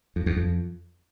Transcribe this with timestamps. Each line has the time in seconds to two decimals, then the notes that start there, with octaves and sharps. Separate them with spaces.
0.16 F2
0.26 E2
0.37 F2